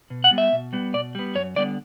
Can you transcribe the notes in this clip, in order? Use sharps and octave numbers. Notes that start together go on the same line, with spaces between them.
B2
F#5
G3 B3
E5
B2
G3 B3
B2 D5
G3 B3
F#2 C#5
D3 G3 B3 D5